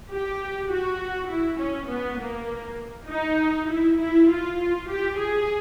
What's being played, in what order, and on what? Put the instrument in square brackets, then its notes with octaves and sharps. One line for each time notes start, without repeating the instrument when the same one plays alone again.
[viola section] G4
F#4
E4
C#4
B3
A#3
D#4
E4
E4
F4
G4
G#4